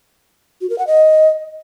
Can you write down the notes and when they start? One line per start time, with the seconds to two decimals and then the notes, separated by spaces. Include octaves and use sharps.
0.61 F#4
0.70 A#4
0.78 F#5
0.87 D#5